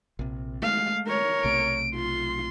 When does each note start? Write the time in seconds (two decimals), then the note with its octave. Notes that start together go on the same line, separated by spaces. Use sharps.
0.19 A#1 C3
0.62 G#3 A3 F5
1.07 A#4 C#5
1.44 B1 C3 A3 D7
1.95 F4 C6